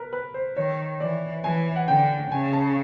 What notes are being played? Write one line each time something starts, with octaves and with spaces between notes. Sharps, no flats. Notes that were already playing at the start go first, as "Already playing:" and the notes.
Already playing: A#4 B4
B4
C5
D#3 C#5
E3 D5
E3 G#5
F#5
D3 G5
C#3 G#5
A5